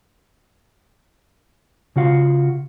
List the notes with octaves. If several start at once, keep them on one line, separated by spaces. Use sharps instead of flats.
C#3 F4 F#4 F5